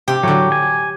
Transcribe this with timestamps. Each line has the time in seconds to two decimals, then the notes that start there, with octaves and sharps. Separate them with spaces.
0.08 C3 G4
0.23 A2 D3 F#3
0.52 G#5